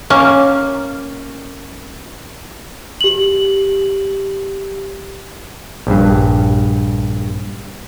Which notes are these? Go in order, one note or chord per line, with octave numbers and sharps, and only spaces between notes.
A#3 C#4
G4 F#7
A#1 G2